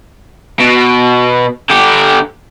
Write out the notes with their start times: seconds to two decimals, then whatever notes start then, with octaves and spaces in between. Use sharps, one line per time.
0.59 B2
1.70 D3 G4